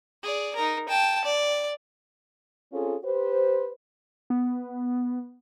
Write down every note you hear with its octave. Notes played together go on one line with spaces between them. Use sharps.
G#4 D5
D#4 A#4
G5 A5
D5
C4 C#4 F4 G#4 A4
G4 B4 C5
B3